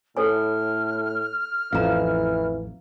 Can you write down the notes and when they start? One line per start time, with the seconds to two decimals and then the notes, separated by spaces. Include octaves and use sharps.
0.17 A2 A4 C#5 G#5 F6
1.73 A1 F2 E3 F5 A#5